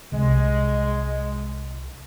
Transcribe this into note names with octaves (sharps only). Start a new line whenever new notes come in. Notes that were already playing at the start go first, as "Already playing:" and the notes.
C2 G#3